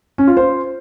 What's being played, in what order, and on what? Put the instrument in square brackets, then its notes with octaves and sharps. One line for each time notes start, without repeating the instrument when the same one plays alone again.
[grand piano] C#4
F4
C5